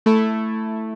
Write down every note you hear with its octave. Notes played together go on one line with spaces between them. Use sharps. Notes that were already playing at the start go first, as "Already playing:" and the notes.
A3 E4 A4